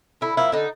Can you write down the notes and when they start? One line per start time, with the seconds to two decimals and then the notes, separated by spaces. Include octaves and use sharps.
0.21 D3 E4
0.37 F3 A#3 E4
0.52 D3 D#4